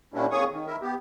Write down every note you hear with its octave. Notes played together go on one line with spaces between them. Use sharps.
A#2 G3 A#3 C#4 D4 E4
F2 A#3 G#4 C#5 C#6 D#6
D#3
E4 A#4 E5
B3 G4